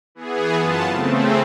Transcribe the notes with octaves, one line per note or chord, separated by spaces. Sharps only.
E3 B3 G#4
F#2 B3 F4 A5
C#3 A3 C4